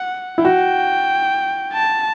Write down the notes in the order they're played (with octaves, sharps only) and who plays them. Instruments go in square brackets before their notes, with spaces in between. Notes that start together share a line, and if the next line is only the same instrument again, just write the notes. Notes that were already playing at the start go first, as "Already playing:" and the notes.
Already playing: [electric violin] F#5
[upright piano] E4
[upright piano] F#4 [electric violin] G5
[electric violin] A5